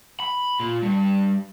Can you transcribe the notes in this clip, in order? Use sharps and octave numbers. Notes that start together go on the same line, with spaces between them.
B5
A#2
G2